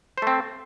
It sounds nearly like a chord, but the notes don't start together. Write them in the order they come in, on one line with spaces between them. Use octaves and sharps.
C5 A3 C4